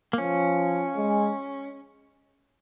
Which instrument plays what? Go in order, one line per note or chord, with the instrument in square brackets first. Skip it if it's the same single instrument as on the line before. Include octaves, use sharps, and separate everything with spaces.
[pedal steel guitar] A#3
[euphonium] F3 [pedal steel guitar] C#4
[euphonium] G#3